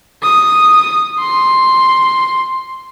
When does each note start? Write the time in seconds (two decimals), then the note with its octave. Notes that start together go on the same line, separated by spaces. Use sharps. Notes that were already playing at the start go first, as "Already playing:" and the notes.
0.23 D#6
1.19 C6